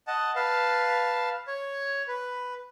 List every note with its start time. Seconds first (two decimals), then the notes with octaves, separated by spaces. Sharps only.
0.07 D#5 F#5 A5
0.36 B4 F5 A5
1.48 C#5
2.08 B4